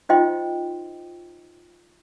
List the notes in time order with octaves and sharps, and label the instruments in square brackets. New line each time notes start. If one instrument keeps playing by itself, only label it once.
[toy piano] D#4 F4 C5 D#5 G5 C6